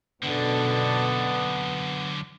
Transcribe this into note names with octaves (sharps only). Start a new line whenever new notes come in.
F#2 B2 D3 B3 D4 A4